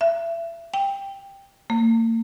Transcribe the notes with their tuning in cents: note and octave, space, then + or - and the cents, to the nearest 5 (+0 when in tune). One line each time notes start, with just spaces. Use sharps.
E5 +30
G5 +15
A#3 -40